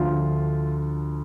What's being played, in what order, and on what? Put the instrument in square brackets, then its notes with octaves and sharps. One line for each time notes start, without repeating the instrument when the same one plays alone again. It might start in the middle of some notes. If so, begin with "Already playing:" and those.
Already playing: [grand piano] D2 D3 F3 F4